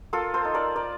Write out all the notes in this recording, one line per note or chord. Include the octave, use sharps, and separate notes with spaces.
A#3 F4 A4
A4 C5
D#4
A#4 D5
A#3 A#4 D5